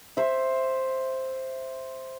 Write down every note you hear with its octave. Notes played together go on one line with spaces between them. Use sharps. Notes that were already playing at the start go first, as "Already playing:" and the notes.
C5 E5